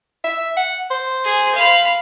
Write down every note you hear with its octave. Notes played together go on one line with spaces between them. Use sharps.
E5
F#5
C5
G#4
F5 B5